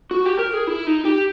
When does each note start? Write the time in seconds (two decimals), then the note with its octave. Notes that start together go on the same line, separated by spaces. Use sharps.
0.11 F#4
0.26 G4
0.39 A#4
0.53 G#4
0.67 E4
0.87 D#4
1.05 G4